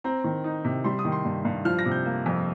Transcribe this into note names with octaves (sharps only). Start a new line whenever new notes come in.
C4 A#5
D#3
D#4
C3
G3 C6
D#6
D#3
C6
G2
G2
F3 F6
A#6
C3
G6
A#3
F2